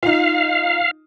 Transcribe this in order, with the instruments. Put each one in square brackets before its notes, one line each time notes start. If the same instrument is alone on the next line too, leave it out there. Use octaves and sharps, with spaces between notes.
[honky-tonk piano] D#4 F4 [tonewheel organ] F5